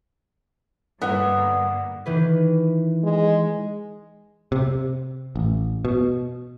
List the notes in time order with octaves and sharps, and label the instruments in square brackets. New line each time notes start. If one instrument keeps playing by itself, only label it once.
[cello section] G2 D3 A#3 [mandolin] B3 [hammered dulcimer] E5 F#5
[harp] D#3 E3 B4
[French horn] G#3
[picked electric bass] C3
A1
B2